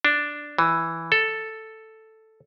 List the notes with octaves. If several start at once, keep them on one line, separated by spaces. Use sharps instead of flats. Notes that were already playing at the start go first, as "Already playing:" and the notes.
D4
E3
A4